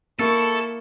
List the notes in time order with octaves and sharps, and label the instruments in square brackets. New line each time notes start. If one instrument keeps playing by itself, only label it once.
[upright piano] A#3 [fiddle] E4 C#6 [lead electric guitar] A4